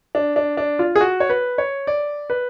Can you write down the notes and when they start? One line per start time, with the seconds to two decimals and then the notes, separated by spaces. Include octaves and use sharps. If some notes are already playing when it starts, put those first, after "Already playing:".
0.15 D4
0.36 D4
0.57 D4
0.79 F4
0.96 G#4
1.01 F#4
1.20 C#5
1.30 B4
1.58 C#5
1.87 D5
2.30 B4